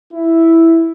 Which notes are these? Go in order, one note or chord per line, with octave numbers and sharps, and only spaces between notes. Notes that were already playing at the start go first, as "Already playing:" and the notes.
E4